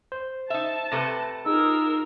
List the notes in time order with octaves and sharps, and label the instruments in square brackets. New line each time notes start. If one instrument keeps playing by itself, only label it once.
[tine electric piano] C5
[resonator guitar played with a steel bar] D#4 E5 [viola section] A5
[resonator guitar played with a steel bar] C3 A3 B4 [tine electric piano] A#6
[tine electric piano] D#4 [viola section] F4 A#4 [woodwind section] G#4 E6